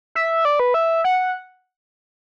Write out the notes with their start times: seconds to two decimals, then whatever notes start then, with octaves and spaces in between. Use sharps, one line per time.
0.15 E5
0.45 D5
0.60 B4
0.74 E5
1.04 F#5